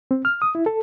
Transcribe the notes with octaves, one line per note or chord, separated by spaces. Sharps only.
C4
F6
D#6
E4
A4